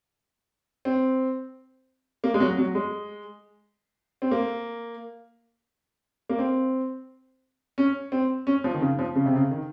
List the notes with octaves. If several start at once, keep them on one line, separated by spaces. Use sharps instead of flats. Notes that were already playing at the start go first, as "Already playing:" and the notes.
C4
A#3
G#3
F#3
F#3
G#3
C4
A#3
A#3
C4
C#4
C4
C#4
F3
D#3
C#3
F3
C#3
C3
C#3
D#3